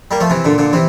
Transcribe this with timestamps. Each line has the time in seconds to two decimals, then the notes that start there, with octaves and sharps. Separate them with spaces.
0.11 G3 A#3
0.20 F3 A3
0.30 C3 E3
0.45 A#2 D3
0.58 A#2 D3
0.73 C3 E3